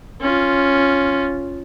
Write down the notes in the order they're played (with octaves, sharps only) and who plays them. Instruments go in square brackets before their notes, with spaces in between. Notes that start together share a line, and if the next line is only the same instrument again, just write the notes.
[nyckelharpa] C#4 F4